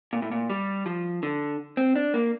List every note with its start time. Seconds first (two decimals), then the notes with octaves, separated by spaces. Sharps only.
0.13 A#2
0.22 A2
0.32 A#2
0.50 G3
0.86 F3
1.23 D3
1.77 C4
1.96 D4
2.14 A#3